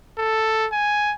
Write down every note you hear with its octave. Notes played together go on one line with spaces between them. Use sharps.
A4
G#5